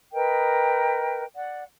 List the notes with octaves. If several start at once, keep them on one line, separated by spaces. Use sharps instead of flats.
A#4 B4 D#5 G5
D5 F#5